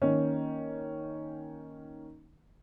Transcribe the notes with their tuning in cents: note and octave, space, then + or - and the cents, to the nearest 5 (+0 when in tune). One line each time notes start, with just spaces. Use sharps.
D#3 +0 A#3 +0 C#4 +0